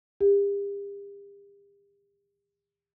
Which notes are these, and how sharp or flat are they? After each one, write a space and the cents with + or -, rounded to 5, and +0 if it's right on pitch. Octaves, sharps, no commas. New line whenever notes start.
G4 +40